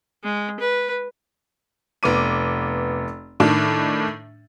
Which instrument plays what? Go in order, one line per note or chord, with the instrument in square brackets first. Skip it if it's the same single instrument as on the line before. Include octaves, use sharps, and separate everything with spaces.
[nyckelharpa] G#3
B4
[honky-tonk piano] F1 B3 D6 D#7
A2 D#3 D4